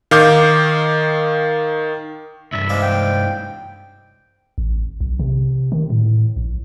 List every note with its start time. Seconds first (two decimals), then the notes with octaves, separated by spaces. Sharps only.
0.11 D#3 F5 D6 G6
2.52 C2 G2 E5
2.69 G#2 D5 F5
2.82 G5
4.58 A1
5.01 B1
5.19 C3
5.72 D#3
5.90 A2
6.36 A#1